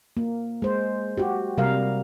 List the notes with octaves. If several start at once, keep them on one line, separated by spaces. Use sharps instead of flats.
A#3
G#3 C5
F#4 G4
C3 G3 A#4 F5